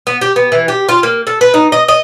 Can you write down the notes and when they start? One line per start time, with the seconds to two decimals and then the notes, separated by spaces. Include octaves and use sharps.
0.07 B3
0.21 G4
0.36 B3
0.52 E3
0.68 G4
0.89 F4
1.03 A#3
1.27 A4
1.41 B4
1.54 D#4
1.72 D#5
1.88 D#5